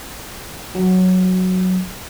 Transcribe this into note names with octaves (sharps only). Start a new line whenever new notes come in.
F#3